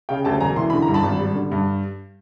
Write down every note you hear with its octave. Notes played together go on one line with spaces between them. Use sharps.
C#3 F5 G5
D2 G5 A5
E1 G#5 A#5
E3 C6
D3 B5
A#5
G2
A5 B5
G#1
G3
D3
G2